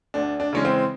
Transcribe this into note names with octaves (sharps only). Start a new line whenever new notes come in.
D2 D4
D4
C#3 E3 G#3 C#4
C4